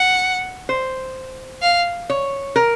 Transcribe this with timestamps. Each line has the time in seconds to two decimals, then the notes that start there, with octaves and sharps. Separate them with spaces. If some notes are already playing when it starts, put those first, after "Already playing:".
Already playing: F#5
0.69 C5
1.62 F5
2.10 C#5
2.56 A#4